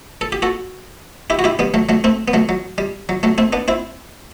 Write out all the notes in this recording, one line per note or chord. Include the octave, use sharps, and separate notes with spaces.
A4
G4
F#4 A4
E4 G4
F#4
E4 G4
G3 B3
F#3 A3
F#3 A3
A3 C4
B3
F#3 A3
F#3
G3
F#3
F#3 A3
A3 C4
B3 D4
C4 E4